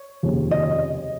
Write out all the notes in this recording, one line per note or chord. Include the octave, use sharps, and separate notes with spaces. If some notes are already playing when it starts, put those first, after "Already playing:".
Already playing: C#5
F1 D#2 C#3 F3
D#5